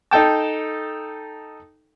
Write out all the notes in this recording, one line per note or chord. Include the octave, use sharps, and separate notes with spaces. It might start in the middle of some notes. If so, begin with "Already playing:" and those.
D#4 A4 G5 A5